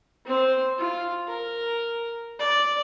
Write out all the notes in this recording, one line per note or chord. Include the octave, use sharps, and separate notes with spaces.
C4 C5
F4
A#4
D5